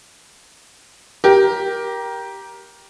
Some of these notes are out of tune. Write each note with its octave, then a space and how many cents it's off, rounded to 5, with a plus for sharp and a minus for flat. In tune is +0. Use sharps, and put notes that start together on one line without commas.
G4 -5 A#4 +15